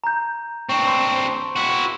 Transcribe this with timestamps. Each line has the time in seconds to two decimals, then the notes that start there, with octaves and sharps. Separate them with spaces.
0.04 A#5 G6
0.69 C4 D4 C#6
0.88 C6
1.56 E4 F#4